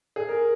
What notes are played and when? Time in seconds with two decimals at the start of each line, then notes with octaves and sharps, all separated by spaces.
0.16 G#4
0.28 A#4